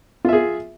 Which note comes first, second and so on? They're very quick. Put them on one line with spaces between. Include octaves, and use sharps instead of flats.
F4 E5 G#4